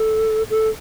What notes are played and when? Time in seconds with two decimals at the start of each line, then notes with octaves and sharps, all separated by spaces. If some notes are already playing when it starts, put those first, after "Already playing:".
Already playing: A4
0.50 A4